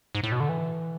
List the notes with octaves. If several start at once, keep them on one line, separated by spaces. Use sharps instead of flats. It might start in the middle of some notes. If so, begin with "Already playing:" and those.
G#2
A2
B2
D3
E3